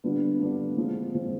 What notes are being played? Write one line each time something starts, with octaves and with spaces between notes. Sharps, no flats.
D3 G3 B3 D4 F4
D3 G3 B3 D4 F4
F3 G#3 C4 F4
F3 G#3 C4 F4